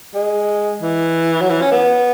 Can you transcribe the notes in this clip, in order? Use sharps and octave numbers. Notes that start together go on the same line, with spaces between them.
G#3
E3
F#3
E3
C#4
B3